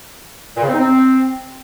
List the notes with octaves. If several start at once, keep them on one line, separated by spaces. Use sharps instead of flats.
A#2
C#3
C4
D#4
C4